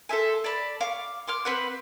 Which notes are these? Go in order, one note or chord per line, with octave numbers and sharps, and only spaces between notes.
A4 C5 E5 G#5
D5 A5 B5
F5 C#6 D6
C6 D6 F6
C4 B4 F#5